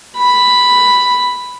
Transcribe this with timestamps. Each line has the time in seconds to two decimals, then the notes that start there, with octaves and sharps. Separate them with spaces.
0.17 B5